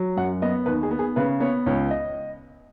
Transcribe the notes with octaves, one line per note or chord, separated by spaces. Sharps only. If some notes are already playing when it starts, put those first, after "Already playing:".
Already playing: F#3
F#2 F#5
B3 D#5
D#2 B4
G#4
B3
G#4
C#3 B4
B3 C#5
C#2 C#5
D#5